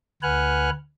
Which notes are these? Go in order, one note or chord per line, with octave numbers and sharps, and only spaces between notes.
D2 B4 F#5 G#5 F6 F#6